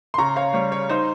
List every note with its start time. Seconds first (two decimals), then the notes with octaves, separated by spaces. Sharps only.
0.14 C6
0.18 C#3 A#5 C#6
0.36 C#5 F5
0.54 G3 C#5
0.72 C#5
0.89 D#4 C5